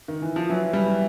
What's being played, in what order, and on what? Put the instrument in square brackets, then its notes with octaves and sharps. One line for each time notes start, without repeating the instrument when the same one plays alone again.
[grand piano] D#3
E3
F3
[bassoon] E3 [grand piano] F#3
[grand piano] G3